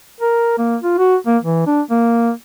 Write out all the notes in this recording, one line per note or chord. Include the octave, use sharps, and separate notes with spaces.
A#4
A#3
F4
F#4
A#3
E3
D4
A#3